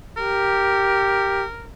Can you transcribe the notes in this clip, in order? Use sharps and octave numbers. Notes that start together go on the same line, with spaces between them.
G4 A#4